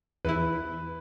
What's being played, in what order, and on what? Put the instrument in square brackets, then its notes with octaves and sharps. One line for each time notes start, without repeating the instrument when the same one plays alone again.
[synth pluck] E2 E3 E4 [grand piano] B4